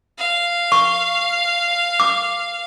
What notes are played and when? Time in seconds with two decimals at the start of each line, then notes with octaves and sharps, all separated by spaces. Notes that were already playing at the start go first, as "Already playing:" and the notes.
0.18 F5
0.72 C#6
2.00 D6